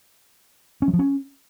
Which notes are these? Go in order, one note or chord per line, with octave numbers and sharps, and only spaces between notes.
C#4
F#3
F3
C#4